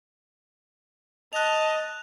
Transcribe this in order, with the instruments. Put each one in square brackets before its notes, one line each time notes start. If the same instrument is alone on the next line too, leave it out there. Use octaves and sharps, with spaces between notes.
[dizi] D#5 [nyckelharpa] A5 [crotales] F#6 F7